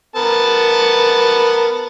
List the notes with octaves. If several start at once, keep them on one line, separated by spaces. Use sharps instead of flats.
B3 A#4 A5